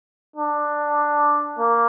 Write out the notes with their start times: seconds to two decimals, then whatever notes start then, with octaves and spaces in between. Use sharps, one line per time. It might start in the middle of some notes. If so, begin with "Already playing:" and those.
0.36 D4
1.59 A#3